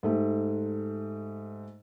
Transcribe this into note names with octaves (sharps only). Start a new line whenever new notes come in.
G#2 A3 G4